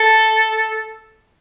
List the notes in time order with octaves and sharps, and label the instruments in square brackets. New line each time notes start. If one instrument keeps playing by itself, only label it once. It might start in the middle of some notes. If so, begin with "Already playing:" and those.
Already playing: [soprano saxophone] A4